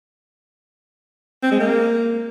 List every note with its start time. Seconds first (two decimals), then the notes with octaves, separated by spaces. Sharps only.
1.43 C4
1.52 G#3
1.60 A#3